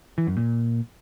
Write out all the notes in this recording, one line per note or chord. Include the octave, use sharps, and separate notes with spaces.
E3
F#2
A#2